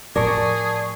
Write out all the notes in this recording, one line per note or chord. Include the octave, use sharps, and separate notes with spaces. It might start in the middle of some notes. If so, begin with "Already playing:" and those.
A2 F3 G#4 A#4 D5 A5 C#6